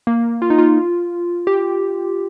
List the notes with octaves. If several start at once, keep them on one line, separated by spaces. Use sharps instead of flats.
A#3
F4
D#4
F4
G4